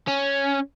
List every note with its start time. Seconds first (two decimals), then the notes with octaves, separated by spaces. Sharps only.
0.07 C#4